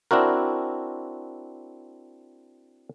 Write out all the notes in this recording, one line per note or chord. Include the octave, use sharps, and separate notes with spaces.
C4 D4 E4 F#4 A#4